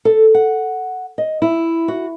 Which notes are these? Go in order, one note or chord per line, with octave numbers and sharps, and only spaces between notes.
A4
F#5
D#5
E4
F#4